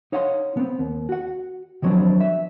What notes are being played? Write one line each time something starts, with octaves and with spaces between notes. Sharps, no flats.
D#4 C#5 F5 F#5 A5 C6
B3 C4
D#2
F#4 F#5
D#3 F3 F#3 B3 C4 D4
E5